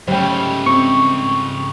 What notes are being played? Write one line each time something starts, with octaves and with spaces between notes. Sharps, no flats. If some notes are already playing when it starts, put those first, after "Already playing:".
G#2 C#3 G3 A3 C#4 C5 G5
C4 C#6